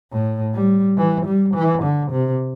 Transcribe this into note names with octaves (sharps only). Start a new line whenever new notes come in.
A2
G3
E3
G3
E3
D3
C3